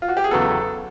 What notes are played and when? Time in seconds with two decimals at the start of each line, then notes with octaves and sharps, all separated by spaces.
0.02 F4
0.08 F#4
0.17 G4
0.24 G#4
0.31 E2 C#3 F#3 B3 A4